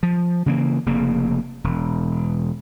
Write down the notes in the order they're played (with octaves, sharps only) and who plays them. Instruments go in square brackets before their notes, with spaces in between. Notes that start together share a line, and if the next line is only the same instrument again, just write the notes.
[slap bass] F3
C#3 E3 A3 A#3
F1 C#3 A#3
E1